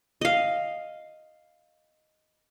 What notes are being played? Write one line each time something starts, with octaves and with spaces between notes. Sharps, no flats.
D#5 F5